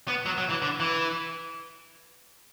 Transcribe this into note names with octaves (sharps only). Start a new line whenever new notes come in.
B3
F#3
F#3
E3
D3
E3